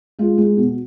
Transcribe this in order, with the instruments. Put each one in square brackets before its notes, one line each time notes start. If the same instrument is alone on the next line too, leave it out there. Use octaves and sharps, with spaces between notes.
[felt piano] G#3 F4
G#3
B2